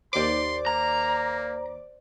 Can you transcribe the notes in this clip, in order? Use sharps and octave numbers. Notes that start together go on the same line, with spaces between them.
D#2 C5 D5 C6 D6
A#3 A#5